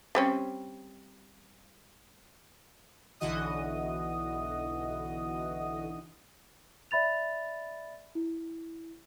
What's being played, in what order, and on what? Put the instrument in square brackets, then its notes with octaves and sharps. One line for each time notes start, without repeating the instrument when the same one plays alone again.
[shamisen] G3 C4 C#4
[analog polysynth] B1 D3 E3 F#4 D#5 D#6
[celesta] D5 E5 B5 A6 F7
E4